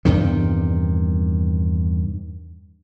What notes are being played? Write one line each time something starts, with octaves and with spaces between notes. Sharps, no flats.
E2 G2 C3 D#3